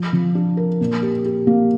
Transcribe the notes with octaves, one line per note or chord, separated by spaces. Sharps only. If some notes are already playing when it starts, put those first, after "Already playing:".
Already playing: F3
F3
D4
A#4
A#2
G4
G4
A#3